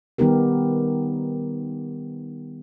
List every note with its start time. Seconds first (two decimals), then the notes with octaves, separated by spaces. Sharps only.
0.18 D#3 G3 B3 D#4 G4 A#4